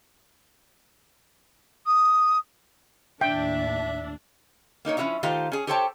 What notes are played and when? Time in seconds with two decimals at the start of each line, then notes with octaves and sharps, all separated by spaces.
1.86 D#6
3.21 D#2 A2 D4 E5 G5
4.85 A#3 D#4 A#4 C#5
4.97 F3 C#4 E4 F#4 C#5 E5
5.23 D#3 A3 F4 G4 C5 F5
5.52 C#4 G#4
5.67 G4 A4 C5 C#5 G5 A5